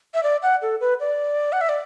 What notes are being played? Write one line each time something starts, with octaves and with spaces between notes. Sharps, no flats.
E5
D5
F#5
A4
B4
D5
F#5
E5
D5